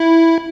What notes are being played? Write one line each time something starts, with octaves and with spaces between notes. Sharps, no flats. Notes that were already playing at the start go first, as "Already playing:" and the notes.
Already playing: E4